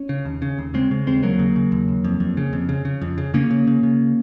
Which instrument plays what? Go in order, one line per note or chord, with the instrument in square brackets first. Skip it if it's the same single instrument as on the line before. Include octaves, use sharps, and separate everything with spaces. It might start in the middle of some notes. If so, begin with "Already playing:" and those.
Already playing: [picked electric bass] C#4
C#3
D#2
C#3
D#2
C#3 G#3 C4
C#3
D#2 G#3 C4
D#2 F#3 A#3
C#3
C#3
D#2
D#2
F2
F2
C#3
F2
C#3
C#3
F2
C#3
C#3 A#3 C#4
C#3
C#3
C#3